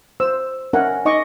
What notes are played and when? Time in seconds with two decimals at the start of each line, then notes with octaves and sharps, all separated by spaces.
0.20 C5 E6
0.73 C#4 A#4 E5 F#5 G#5
1.05 D#4 D#5 C#6 D6